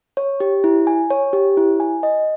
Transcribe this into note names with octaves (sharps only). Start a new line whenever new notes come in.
C#5
G4
E4
G#5
C#5
G4
E4
G#5
D#5